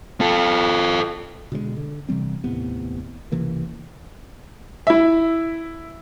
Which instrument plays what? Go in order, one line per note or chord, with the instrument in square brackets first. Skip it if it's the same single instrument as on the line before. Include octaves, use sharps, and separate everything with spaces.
[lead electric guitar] F4 A4
[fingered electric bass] B2 D3 G3 G#3
D3
C3 E3 G3 C4
D#2 A2 C3 B3
C#2 C3 E3 A#3
[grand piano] E4 E5